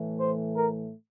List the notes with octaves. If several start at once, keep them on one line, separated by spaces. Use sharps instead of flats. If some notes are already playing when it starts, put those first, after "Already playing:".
Already playing: A2 E3 A3
C5
A#4